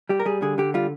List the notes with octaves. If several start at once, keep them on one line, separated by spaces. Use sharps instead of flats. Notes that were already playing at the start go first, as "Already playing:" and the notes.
G3 G4
A#4
G3 G#4
D3 G#4
D3 G4
G3 F4